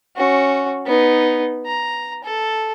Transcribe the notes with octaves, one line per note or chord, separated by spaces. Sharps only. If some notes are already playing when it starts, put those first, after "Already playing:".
C#4 F#4
B3 D#4
A#5
A4